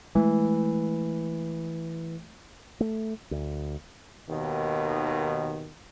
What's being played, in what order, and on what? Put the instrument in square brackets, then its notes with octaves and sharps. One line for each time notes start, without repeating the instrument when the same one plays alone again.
[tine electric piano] E3 [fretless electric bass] G#3 A3
[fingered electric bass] A3
D2
[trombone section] D#2 B2 D#3